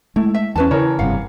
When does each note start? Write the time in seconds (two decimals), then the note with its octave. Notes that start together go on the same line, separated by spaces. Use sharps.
0.16 G#3 A3 E4
0.34 E5
0.56 E2 C#4 B4 A5
0.71 C#3 E3 A#4 C#5
0.99 F#1 G2 C3 F5 F#5